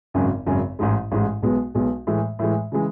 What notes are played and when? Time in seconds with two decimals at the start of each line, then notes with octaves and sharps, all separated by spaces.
0.14 G#1 F#2 C#3
0.46 G#1 F#2 C#3
0.79 A1 G#2 G#3
1.12 A1 G#2 G#3
1.42 B1 B2 G#3 B3
1.75 B1 B2 G#3 B3
2.07 A2 E3 G#3
2.39 A2 E3 G#3
2.72 C#3 E3 G#3